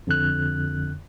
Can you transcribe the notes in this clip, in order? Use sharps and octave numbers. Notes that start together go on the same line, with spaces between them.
F2 D3 F#6